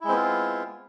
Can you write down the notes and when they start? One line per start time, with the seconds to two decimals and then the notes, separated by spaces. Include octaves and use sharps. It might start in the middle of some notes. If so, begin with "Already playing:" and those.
0.01 E4
0.04 G#3
0.08 C4
0.12 B3
0.16 F4